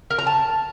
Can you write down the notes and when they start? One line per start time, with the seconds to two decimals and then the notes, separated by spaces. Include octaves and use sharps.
0.11 A#4
0.19 A#5
0.27 A5